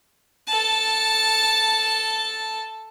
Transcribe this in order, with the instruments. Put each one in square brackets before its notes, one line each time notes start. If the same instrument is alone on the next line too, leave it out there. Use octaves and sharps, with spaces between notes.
[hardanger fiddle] A4 A5